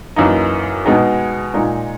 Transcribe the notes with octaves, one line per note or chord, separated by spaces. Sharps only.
F#2 E3 A#3 D#4
B2 G#3 B3 D#4 G#4
A#2 G#3 D#4